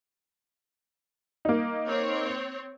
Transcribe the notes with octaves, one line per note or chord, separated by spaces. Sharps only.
A#3 D#4
C4 C#5